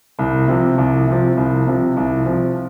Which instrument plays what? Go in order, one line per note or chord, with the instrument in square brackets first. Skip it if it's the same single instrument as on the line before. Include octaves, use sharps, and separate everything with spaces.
[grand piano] C2
C3 F3
C2
C3 F3
C2
C3 F3
C2
C3 F3